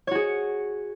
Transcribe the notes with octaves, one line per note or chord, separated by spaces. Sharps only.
F#4 G#4 C#5